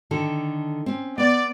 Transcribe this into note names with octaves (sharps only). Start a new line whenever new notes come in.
D3 D#3 A4
C4 C#4
B3 D5